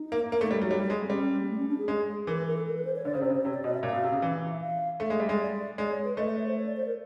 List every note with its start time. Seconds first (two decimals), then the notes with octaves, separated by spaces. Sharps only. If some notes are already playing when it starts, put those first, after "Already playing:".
Already playing: D#4
0.12 A#3
0.32 A#3
0.41 A3
0.51 G3
0.61 F#3
0.71 G3
0.90 G#3
1.04 C4
1.10 G3 C#4
1.41 A#3
1.49 A3
1.58 C#4
1.68 D4
1.78 G#4
1.88 G#3
2.27 E3 A#4
2.37 B4
2.46 A#4
2.56 A4
2.66 A#4
2.75 B4
2.85 C5
2.96 C#5
3.05 D3 D5
3.14 C#3 C5
3.21 C3
3.24 C5
3.30 C#3
3.35 C5
3.44 C3 C#5
3.54 D5
3.64 B2 D#5
3.74 E5
3.83 A#2 F5
3.93 B2
4.03 C3
4.12 C#3
4.22 E3
4.50 E5
4.61 F5
5.00 A3 E5
5.10 G#3
5.20 G3
5.29 G#3
5.40 D5
5.78 G#3 D5
5.91 C#5
6.05 B4
6.17 A3 D#5
6.27 E5
6.37 C#5
6.47 C5
6.56 C#5
6.66 D5
6.77 C5
6.86 A#4